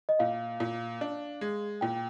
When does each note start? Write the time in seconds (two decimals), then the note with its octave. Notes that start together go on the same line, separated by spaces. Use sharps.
0.09 D#5
0.19 A#2 F5
0.60 A#2
1.01 D4
1.41 G#3
1.81 A#2 G5